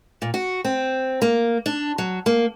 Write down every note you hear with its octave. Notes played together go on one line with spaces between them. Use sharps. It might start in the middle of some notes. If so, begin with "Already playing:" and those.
A#2
F#4
C4
A#3
D4
F#3
A#3